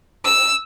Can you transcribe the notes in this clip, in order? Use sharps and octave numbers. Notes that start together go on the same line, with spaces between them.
E6